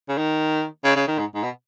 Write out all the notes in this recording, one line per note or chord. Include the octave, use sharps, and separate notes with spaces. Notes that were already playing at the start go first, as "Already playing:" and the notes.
C#3
D#3
C#3
C#3
D#3
G#2
G#2
B2